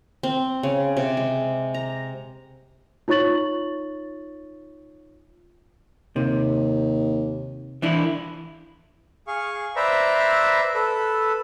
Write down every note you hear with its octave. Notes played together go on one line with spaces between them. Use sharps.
C4
C#3
C3
G#3
A#5
D#4 F4 C#5 C#6 A6 F#7
D#2 C3
E3 D4 E4
G#4 F5 C#6
B4 C5 D5 E5 A#5
A4 B4